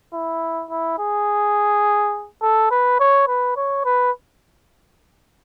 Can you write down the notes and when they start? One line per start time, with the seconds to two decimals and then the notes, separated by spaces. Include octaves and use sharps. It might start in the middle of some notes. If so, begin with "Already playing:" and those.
0.13 E4
0.70 E4
0.99 G#4
2.42 A4
2.71 B4
3.00 C#5
3.28 B4
3.57 C#5
3.85 B4